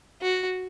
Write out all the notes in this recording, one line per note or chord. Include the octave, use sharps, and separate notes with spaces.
F#4